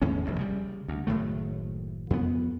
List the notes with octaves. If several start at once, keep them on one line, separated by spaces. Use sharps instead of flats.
E2 A2 D#3 C#4
F1 A#1 G2
C#3 G3
D2
F#1 A2 D#3 A3
F2 B3